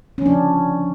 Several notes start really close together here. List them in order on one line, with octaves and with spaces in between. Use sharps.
C#4 F3 D4